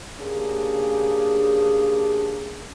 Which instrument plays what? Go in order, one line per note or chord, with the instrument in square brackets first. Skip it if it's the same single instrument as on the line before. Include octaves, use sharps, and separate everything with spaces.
[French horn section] C#3 A#3 D4 G4 G#4